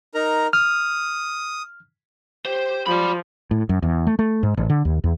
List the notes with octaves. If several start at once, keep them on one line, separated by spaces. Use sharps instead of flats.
D#4 A#4 A#5
D#6 F6
G4 C5
F3 D5 B5
A2
F#2
E2
A3
A3
G#2
A1
D3
D#2
E2